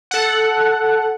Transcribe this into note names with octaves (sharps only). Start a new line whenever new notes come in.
A4 F#5